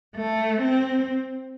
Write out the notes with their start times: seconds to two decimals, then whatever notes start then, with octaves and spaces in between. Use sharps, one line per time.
0.16 A3
0.62 C4